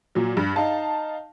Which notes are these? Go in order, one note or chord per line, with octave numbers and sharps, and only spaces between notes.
A#2 F#3
G2
D#4 F5 A5